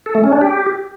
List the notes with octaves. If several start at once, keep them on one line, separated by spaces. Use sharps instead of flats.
A4
A3
C#4
D4
G4